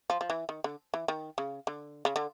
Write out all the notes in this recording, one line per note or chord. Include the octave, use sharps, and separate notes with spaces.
F3
F3
E3
D#3
D3
E3
D#3
C#3
D3
C#3
D3